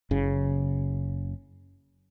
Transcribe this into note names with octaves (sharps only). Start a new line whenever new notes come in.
F#1 C#3